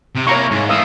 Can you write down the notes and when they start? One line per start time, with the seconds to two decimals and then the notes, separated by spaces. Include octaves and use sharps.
0.15 C3
0.27 A#3 E4 C#5 A#5 C#6
0.51 G#2
0.69 E3 A3 F5 D#6 E6